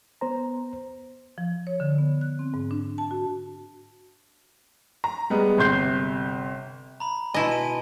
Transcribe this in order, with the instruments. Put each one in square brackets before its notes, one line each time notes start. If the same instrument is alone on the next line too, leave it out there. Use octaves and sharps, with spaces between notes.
[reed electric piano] B3 C5 A#5
[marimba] F3
C#5
D3
B3
F#6
C4
G#2
D4
A5
F#4
[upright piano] A#5
G3 G#3 B3
G1 C3 C6 G6 C7
[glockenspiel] A#5 B5
[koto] B2 E4 D#5 [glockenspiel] G#5 A5 C6
[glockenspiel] D#7